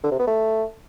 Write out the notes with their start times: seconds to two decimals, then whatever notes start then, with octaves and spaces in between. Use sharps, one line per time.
0.04 D3
0.11 C3
0.19 B3
0.27 A3